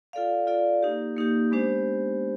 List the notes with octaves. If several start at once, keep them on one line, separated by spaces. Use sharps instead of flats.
F4 A4 D5 F5
F4 A4 D5 F5
A#3 D#4 G4
A#3 D#4 G4
G#3 B3 D4 G4 C5